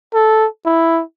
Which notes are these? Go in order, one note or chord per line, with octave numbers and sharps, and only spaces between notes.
A4
E4